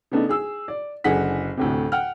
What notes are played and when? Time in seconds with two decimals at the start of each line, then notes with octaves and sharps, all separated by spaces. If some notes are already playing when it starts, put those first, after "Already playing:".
0.12 C#3 A3 B3 D4 D#4
0.29 G#4 E6
0.68 D5
1.04 F#1 D3 G#4 F#5 B6
1.57 D2 A2 C3
1.92 F#5 G5 F6